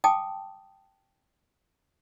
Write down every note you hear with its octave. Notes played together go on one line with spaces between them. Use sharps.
G5 A5 D6 D#6